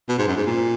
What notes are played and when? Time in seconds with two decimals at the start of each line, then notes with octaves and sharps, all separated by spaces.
0.09 B2
0.18 G#2
0.27 F#2
0.37 G#2
0.46 A#2